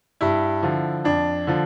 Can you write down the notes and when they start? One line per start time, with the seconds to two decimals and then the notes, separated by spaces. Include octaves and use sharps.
0.21 G2 E4
0.63 D3 F3
1.05 F2 D4
1.47 D3 F3